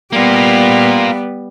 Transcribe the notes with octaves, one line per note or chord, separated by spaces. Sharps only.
G3 A#3 B3 F4